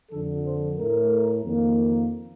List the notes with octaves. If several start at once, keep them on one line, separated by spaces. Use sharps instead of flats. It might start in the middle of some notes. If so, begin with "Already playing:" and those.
F2 D3 F3 A4
C5
A2 A3 A#4
F2 D#3 A#3